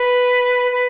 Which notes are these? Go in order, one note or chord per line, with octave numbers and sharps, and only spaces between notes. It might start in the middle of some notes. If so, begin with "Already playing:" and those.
Already playing: B4
B4